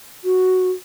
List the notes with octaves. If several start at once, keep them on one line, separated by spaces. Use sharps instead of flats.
F#4